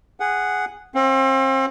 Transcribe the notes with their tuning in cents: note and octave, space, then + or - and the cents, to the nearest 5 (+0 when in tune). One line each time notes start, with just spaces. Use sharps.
G#4 -10 F#5 +0
C4 +35 F5 +45